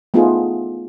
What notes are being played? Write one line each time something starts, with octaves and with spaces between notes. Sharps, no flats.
A3 B3 D#4 F4 G#4